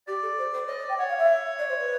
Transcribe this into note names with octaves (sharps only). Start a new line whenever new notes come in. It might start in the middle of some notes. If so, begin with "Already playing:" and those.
G4 D5
A4
C5
C5
C#5 D#5
C#5
D5
G5
C#5 F#5
F5
E5
D5
C5
B4